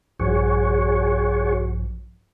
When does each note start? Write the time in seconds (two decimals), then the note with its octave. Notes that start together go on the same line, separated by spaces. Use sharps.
0.20 A#1 G2 F3 F#4 G#4 C#5